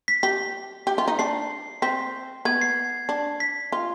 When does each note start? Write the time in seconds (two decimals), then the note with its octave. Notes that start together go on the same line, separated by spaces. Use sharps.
0.08 B6
0.23 G4 B6
0.87 G4
0.98 F4
1.08 D#4
1.19 D4 C7
1.82 C4 B6
2.45 B3 G#6
2.61 C7
3.09 D4
3.40 B6
3.72 F4